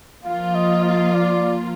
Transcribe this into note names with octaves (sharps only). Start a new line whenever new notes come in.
F3 A#3 F4 F5
D#5
D#5
D5